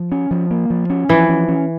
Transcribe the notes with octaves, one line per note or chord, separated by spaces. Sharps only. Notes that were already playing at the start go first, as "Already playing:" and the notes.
Already playing: F3
C#4
F3
A#3
F3
C#4
E3 F3
C#4
C#4